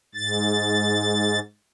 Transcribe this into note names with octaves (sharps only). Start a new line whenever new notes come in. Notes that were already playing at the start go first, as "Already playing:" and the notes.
G#2 A6